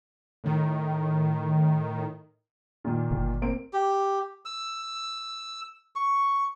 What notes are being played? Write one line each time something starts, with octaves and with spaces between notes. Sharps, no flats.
A2 D#3
A#2 D#3
G1
A#3 C4 D7
G4
E6
C#6